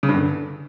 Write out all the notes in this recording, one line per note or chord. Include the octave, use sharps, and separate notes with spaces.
C#3
G2
D3